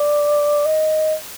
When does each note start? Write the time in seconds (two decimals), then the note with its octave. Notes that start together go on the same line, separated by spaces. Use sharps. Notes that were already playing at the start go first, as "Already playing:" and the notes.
Already playing: D5
0.66 D#5